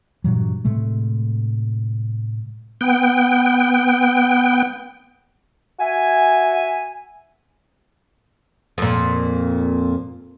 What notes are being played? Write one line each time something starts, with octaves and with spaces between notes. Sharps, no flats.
G2 A#2 E3 F#3
A2 C3 G#3 A3
B3 G5
F#4 E5 G#5
F2 A#2